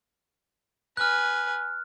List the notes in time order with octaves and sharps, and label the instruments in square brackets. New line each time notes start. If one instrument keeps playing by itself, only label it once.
[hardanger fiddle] B4 G#5 [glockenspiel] F6 F#6